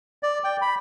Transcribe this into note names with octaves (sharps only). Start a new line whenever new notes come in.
D5
G5
B5